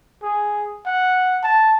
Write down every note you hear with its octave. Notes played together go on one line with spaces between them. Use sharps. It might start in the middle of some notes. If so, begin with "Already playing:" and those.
G#4
F#5
A5